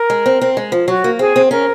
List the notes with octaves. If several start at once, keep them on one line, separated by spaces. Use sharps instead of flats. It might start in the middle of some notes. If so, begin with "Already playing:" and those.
Already playing: A#4
G#3
C4
C4
G#3
F3
F#3 F#4
A#3
C4 G#4
C4
C#4 A#4